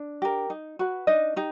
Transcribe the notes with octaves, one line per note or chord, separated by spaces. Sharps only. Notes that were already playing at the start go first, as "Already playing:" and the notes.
Already playing: D4
G4 A#4
D#4
F#4 B4
D4 D#4 D#5
D#4 G4